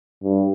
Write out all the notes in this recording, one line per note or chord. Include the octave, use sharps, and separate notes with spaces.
G2